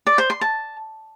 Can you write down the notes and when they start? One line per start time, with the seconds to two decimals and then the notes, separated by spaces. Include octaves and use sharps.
0.07 D5
0.18 C5
0.30 C6
0.41 A5